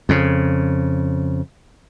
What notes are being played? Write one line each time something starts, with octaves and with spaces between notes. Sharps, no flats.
F2 C#3